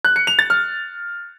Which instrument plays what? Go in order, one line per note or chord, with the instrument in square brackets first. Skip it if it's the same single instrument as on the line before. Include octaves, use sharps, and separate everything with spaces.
[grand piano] F#6
C#7
F7
A6
F6